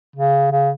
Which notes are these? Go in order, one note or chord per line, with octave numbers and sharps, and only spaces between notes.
C#3
C#3